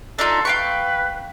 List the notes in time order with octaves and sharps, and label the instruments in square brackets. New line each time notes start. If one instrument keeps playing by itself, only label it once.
[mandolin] D4 D#4 F4 [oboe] A4
[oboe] B4 [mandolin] F5 G5 C#6